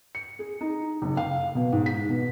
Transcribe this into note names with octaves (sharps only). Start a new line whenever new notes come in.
C#7
G#4
D#4
F#1
F5
B2
G#2
B6
B2